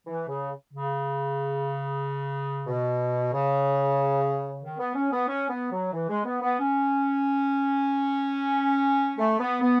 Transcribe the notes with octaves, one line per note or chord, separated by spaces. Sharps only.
E3
C#3
C#3
B2
C#3
D#3
B3
C#4
B3
C#4
B3
F#3
E3
G#3
B3
B3
C#4
A3
B3
B3